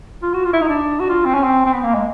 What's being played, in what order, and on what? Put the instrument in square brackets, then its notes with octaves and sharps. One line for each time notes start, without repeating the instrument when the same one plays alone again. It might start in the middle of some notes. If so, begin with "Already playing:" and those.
[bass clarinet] F4
F#4
F4
E4
D#4
D4
F#4
F4
C4
C#4
C4
C4
B3
A#3
G#3